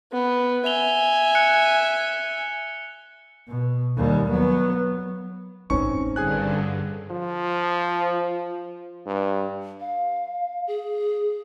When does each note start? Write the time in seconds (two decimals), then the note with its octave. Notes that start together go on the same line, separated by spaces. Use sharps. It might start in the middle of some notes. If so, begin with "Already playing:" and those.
0.12 B3
0.66 E5 G#5 F7 G7
1.35 F#6 C#7
3.48 B2
3.97 D#2 G3
4.31 F#3 B3
5.70 A1 A2 C4 C#4 D#4 C#6
6.16 G2 D3 G#4 G#5 F#6
7.11 F3
9.06 G2
9.80 F5
10.67 G#4